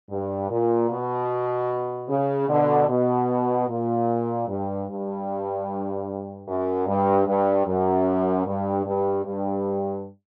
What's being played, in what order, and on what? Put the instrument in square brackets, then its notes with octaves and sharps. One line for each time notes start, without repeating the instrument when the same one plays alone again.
[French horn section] G2
A#2
B2
C#3
B2 D3
B2
A#2
G2
G2
F#2
G2
G2
F#2
G2
G2
G2